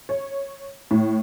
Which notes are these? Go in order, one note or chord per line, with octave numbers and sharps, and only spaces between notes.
C#5
A2